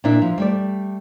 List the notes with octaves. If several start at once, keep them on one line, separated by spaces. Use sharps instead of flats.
A#2 D4 E4
F3
G3 A3 D5